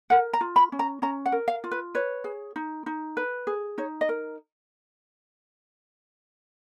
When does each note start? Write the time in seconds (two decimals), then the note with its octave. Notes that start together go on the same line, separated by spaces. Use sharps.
0.10 A#4 F#5
0.33 A#5
0.41 F4
0.56 B5
0.72 C#4
0.79 A#5
1.02 C#4 A#5
1.26 F#5
1.32 A#4
1.48 F5
1.64 F4
1.71 B4
1.95 B4 C#5
2.24 G#4
2.56 D#4
2.86 D#4
3.17 B4
3.47 G#4
3.78 D#4 C#5
4.01 D#5
4.09 A#4